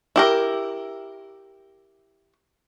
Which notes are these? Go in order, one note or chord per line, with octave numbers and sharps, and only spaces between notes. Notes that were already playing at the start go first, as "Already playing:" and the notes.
E4 G4 A#4